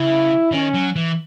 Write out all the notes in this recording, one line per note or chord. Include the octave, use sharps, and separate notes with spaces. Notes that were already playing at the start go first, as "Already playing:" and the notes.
Already playing: C#3 E4
D#3 C#4
F#3
E3